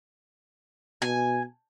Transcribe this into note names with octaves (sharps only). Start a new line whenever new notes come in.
B2 G#5